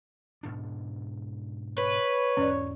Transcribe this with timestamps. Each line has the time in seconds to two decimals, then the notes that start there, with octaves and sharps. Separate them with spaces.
0.43 G#2 B2 D4
1.78 B4 C#5
2.37 E2 G#2 G#3 C#4 D5